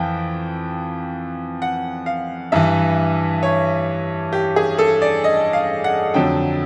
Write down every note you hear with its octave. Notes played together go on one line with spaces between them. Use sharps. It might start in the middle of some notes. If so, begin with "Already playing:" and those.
Already playing: F2 E3 G5
F#5
F5
G2 E3 E5
C#5
G4
G#4
A4
D5
D#5
F5
F#5
F2 D3 F#3 G5